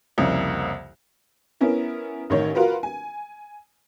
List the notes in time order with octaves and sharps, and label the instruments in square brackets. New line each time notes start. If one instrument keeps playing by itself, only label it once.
[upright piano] C2 F2 C#3 A#3
[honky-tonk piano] B3 C#4 E4 A#4
A1 D#3 C#5
F4 F#4 A#4 B4
G#5